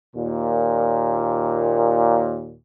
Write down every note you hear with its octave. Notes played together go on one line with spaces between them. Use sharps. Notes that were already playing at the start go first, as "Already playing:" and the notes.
D#2 A#2